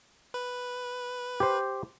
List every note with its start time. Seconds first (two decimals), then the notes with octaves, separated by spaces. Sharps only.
0.34 B4
1.40 G4 C5